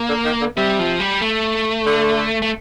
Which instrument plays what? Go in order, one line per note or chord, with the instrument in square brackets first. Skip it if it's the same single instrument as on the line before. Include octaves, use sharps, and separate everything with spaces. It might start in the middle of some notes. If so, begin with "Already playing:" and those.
Already playing: [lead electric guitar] A#3
[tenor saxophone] D3
D#3
D3
[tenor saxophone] C3 [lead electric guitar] G3
[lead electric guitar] F3
G3
A3
[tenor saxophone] D3
[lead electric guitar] A3